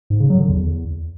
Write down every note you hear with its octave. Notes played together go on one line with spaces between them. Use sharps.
G#2
C#3
F#3
D3
E2